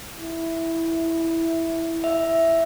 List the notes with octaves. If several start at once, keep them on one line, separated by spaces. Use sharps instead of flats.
E4
E5